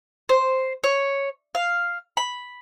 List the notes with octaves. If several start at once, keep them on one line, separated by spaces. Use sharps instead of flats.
C5
C#5
F5
B5